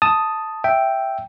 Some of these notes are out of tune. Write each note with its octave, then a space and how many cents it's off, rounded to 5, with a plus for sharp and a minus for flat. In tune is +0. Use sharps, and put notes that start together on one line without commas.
A5 +0 D#6 +0
E5 +0 G5 +0